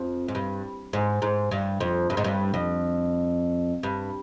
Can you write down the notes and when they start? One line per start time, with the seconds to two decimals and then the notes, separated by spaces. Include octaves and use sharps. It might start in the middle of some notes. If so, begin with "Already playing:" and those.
Already playing: F2
0.28 G#2
0.35 G2
0.93 G#2
1.22 G#2
1.51 G2
1.80 F2
2.10 G2
2.17 G#2
2.24 G2
2.54 F2
3.83 G2